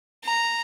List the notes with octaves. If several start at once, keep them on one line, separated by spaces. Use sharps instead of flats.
A#5